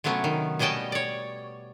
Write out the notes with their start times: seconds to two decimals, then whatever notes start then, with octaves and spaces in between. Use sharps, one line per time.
0.04 C3 F#3 A3 B3 C#4
0.24 D#3
0.59 B2 G3 C#4 D#5 G5 A5
0.92 C#5 D5